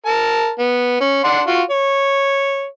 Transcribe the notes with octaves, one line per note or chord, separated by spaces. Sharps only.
A#4 A5
B3
C#4
D4 F#5 C6
F4 F#4
C#5